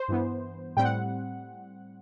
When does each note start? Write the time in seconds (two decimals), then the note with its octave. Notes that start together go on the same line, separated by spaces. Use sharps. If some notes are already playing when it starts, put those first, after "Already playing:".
Already playing: C5
0.08 G2 E3 B3
0.77 A2 G3 C4 G5
0.84 F#5